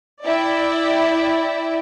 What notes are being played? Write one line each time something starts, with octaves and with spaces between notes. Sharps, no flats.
E4 D5 E5 G5